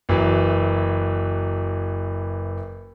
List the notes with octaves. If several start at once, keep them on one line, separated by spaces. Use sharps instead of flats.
F#1 E3 F#3